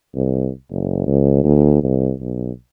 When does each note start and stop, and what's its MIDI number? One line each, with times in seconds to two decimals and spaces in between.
0.15 0.49 36
0.70 1.03 30
1.07 1.43 37
1.44 1.83 38
1.83 2.12 36
2.20 2.51 35